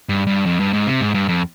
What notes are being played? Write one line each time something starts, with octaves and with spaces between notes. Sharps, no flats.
G2
G2
F2
G2
G#2
C3
G#2
G2
F2